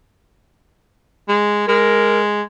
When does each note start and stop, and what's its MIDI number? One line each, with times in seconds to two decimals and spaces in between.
1.29 1.64 56
1.68 2.41 56
1.68 2.21 70